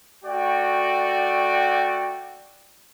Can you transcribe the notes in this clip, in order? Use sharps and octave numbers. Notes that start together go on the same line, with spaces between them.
A3 F#4 D5 G5